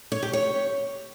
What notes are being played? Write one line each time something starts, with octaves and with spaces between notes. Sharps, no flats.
C#5
G4
C#5